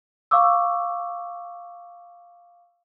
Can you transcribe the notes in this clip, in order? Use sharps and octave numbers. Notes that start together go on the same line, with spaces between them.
F5 C#6 D6 E6